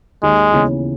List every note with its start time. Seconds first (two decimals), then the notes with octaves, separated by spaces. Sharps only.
0.23 D#2 G#3
0.52 C#3 E3 B3